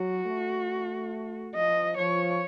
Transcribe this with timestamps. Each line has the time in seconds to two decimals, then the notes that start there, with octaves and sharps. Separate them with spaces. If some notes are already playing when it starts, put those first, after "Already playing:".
Already playing: F#3 F#4
0.26 A3
1.55 F3 D#5
1.98 F3 C#5